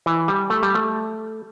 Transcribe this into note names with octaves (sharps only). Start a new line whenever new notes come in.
E3
G3
A3
G3
A3